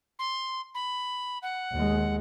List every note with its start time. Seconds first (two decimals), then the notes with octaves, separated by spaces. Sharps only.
0.19 C6
0.75 B5
1.43 F#5
1.72 D#2 G#3